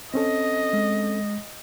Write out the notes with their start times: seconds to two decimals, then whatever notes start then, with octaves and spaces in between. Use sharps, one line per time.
0.14 C4 C#4 A4 D#5
0.73 G#3